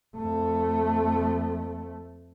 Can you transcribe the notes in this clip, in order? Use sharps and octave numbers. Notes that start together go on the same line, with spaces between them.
F2 A3